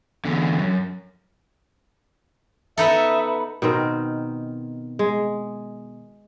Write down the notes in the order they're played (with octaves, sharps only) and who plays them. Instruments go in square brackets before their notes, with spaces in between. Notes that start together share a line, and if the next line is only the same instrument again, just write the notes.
[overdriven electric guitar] E2 D3
F#2
[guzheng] B3 D#4 A4 [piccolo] E5
[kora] B2 D#3 C4 A#4
G#3